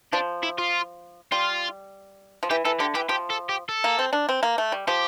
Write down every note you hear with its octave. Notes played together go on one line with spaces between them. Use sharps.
F3 D4
E4
F4
G3 F4
F3
E3 G4
E3 A4
D3 G4
E3 G4
F3 G4
A4
G4
A4
A#3
C4
D4
C4
A#3
A3
G3
F3 G4